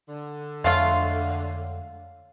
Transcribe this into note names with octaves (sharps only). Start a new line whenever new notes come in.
D3
F2 G#3 A3 F4 C#5 F5 F#5